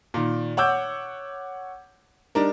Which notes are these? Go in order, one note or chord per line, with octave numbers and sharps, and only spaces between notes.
A#2 D#3
C#5 F#5 D6 E6 G6
G3 D4 D#4 A#4